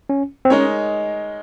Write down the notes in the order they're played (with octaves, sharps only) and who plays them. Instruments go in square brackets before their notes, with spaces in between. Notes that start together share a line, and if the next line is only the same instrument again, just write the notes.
[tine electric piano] C#4
C4
[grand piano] G#3 D#4 A#4 C#5 [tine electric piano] C#4